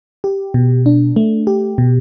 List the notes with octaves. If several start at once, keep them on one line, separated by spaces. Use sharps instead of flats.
G4
B2
D4
A3
G4
B2